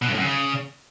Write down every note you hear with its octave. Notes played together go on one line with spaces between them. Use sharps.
B2
G2
A2
F#2
C#3